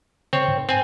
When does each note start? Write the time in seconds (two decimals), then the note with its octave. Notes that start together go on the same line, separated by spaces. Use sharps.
0.33 C#3 C4 C#5
0.48 G#2
0.69 C4 G#5